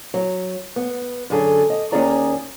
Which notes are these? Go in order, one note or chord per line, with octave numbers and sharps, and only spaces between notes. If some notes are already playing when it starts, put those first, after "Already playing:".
F#3
B3
F#2 D3 G#4 A4
D#5
D#2 C#4 D#4 G#4 D5 A#5